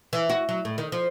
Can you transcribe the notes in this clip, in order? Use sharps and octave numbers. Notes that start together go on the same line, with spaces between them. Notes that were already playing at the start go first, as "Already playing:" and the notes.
E3
F#4
F#3
A2
D#3
F3